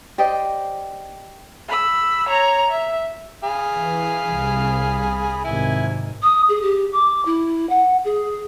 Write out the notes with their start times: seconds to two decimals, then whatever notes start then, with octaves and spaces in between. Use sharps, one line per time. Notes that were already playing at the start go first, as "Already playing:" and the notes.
0.18 G4 C5 D5 D#5
1.69 B5 E6
2.29 C#5 A#5
2.71 E5
3.44 G#4 F5 B5
3.76 E3
4.35 C2
5.44 G#1 C3 D#3 E4 G#5
6.22 D#6
6.48 G#4
6.62 G4
6.92 D6
7.25 E4
7.69 F#5
8.04 G#4